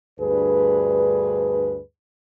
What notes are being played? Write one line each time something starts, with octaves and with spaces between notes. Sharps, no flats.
D2 G2 G#4 B4